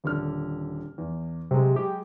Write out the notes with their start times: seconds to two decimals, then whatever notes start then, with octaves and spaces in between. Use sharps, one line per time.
0.04 D#1 D3 F6
0.98 E2
1.51 C3 F#3 G#3
1.76 G4